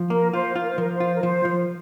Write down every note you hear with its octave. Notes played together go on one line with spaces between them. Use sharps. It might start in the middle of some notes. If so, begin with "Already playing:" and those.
Already playing: F3
A#3 A#4
F4 C5
F4
A#4
C5
F3 A#4
C5
F4
A#4
F3 C5
F3